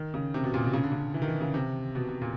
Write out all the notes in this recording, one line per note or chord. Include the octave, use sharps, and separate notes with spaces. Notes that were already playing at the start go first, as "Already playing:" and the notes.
Already playing: D#3
C#3
C3
B2
A#2
B2
C#3
D3
C#3
E3
D#3
E3
C#3
C3
B2
B2
A#2